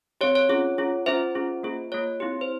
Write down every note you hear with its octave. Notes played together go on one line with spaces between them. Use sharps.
C4 G4 C#5
C#5
C#4 F4 G#4
C#4 F4 G#4
C#4 F4 G#4 C5 E5
C#4 F4 G#4
A#3 F4 G#4
A#3 F4 G#4 C#5
C4 E4 G4
C5